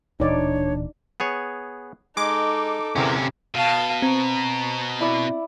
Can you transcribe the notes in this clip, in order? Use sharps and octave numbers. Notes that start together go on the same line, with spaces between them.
D1 A#2 E3 D4 D#4 C#5 D5
B3 G#4 C#5
G#3 D#4 A4 D6
E2 C3 C4 C#4 A#4
B2 F5 A5
C4 A#5
E4 D5